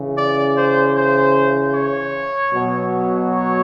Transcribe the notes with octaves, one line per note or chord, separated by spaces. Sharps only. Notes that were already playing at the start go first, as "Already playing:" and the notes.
Already playing: C#3 E3
D5
C5
C5
C#5
B2 F#3
C#5